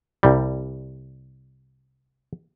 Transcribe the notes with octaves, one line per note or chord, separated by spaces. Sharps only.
C2 G3